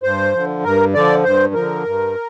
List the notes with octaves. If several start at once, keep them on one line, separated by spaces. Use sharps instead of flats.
G2 C5
D3 F3
G2 A#4
D3 F3 D5
G2 C5
D3 F3 A#4
G2